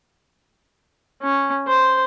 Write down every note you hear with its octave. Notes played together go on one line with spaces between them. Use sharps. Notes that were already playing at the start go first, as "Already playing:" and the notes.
C#4
C5